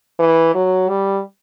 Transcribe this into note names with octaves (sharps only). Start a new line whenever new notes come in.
E3
F#3
G3